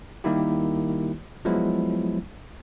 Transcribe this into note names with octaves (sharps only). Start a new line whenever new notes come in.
D#3 G3 A#3 D#4 E4 G4
F3 F#3 G#3 B3 E4